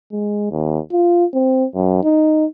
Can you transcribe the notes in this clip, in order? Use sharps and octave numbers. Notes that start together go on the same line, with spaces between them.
G#3
D#2
F4
C4
F#2
D#4